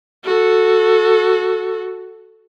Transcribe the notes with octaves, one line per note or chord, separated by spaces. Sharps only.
F#4 A4